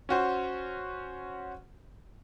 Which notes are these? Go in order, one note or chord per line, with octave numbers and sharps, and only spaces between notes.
C#4 F#4 C5